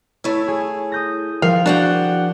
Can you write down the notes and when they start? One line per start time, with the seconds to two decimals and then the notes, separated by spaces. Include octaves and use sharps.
0.24 A3 E4 C#5
0.48 G#4
0.92 D#6 G6 A#6
1.42 F3 A#4 F5
1.66 D4 F#4 F#5 G5